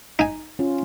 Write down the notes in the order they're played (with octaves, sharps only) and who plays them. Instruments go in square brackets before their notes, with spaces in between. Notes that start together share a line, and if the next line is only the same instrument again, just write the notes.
[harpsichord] D#4 G#5
[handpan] C#4 F4